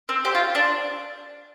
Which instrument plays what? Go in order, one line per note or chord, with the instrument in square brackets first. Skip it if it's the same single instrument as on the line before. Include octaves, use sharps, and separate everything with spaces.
[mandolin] C4
[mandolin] G4 [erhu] C5
[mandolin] F4
D4